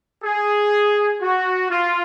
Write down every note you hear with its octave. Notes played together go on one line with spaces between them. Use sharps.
G#4
F#4
F4